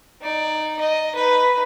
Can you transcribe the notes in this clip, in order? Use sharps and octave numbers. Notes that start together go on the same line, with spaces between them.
D#4 D5
D#5
D#4 B4